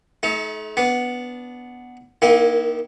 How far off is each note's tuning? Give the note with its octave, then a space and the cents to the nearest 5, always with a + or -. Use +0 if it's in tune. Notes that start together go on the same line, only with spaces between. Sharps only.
A3 -35 D#4 +35
B3 +0 D4 -20
D#3 -10 A#3 +25 E4 -25